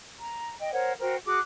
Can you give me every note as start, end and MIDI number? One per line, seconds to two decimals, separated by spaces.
0.18 0.56 82
0.59 0.70 75
0.59 0.70 79
0.72 0.92 70
0.72 0.92 72
0.72 0.92 73
0.72 0.92 78
0.99 1.16 66
0.99 1.16 70
0.99 1.16 72
0.99 1.16 79
1.25 1.38 66
1.25 1.38 68
1.25 1.38 86
1.25 1.38 90